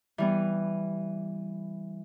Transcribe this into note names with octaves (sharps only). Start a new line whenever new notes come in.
E3 G3 B3